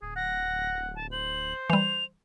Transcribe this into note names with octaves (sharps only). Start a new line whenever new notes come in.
D1 G#4
F#5 A#6
A5
C5 F#7
E3 G3 F7